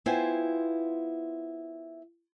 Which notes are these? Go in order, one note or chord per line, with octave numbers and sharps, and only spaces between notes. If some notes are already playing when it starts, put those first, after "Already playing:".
B3 E4 F4 C5 G5 G#5